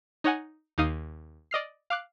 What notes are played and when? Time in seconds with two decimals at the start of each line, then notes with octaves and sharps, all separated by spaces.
0.24 D#4 C#5 D#5 F#5 G#5
0.78 D#2 D#4 F5 D#6 C7
1.51 D5 D#5 F6 C7
1.90 F5 D6 F#6